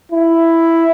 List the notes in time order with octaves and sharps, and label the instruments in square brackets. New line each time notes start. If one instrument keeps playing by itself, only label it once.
[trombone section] E4